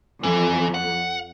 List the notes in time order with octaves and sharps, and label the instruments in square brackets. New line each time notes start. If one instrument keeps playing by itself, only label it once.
[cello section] F2 [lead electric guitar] E3
[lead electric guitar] F#5